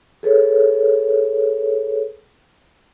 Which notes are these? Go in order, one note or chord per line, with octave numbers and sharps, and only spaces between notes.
G#4 A4 B4 C#5